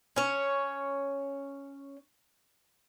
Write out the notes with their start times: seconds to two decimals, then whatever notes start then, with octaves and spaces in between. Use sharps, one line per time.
0.16 C#4 C#5